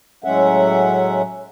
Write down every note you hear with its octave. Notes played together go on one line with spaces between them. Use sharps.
A2 F#3 G#3 C#4 E5 F#5